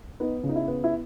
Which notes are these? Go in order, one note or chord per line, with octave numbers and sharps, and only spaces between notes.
B3 D#4
C#3
D#4
E4
B3
E4